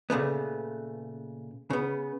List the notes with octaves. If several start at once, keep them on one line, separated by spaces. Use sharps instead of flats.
A#2 C#3 A3 B3
C#3 B3